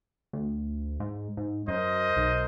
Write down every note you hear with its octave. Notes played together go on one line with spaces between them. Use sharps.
D2
G#2
G#2
F#2 A#4 C5 D#5
B1